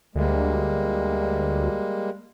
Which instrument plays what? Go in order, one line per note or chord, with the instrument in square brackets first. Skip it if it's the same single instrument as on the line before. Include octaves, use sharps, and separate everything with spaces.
[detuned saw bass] D2 [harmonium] G3 G#3 A#3